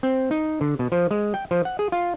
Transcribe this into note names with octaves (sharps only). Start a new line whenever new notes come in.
C4
D#4
D3
B2
F3
G#3
G5
F3
F#5
G#4
F4